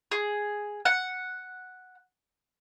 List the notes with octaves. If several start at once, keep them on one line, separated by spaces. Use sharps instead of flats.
G#4
F#5